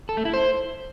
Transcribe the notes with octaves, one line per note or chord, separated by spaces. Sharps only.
A4
A3
E4
C5